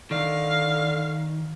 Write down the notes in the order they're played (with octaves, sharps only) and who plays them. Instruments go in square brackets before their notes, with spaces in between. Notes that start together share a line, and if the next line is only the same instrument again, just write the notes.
[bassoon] D3 [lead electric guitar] D#3 [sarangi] F5